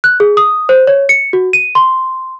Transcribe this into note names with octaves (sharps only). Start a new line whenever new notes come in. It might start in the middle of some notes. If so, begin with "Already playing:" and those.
F#6
G#4
D#6
C5
C#5
C#7
F#4
D#7
C6